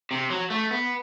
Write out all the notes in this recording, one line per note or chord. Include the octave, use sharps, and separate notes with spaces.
C3
F#3
A3
B3